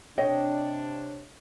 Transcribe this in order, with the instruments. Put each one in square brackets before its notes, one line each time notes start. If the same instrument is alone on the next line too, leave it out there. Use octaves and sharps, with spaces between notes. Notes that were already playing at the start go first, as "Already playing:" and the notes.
[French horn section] C3 D4 [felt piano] C#5 [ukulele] D#5 G5